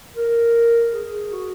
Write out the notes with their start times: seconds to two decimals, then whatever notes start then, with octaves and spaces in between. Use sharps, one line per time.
0.15 A#4
0.93 G#4
1.32 F#4